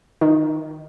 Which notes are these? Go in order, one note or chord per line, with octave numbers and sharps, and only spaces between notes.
D#3